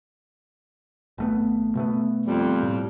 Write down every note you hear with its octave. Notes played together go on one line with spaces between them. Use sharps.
G#1 A3 B3
B2 A3 B3
F2 G3
A2